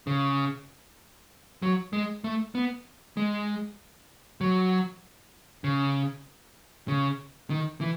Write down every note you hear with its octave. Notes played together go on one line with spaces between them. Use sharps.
C#3
F#3
G#3
A3
B3
G#3
F#3
C#3
C#3
D#3
E3